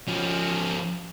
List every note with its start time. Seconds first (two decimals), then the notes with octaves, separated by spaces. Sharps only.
0.08 F3 C#4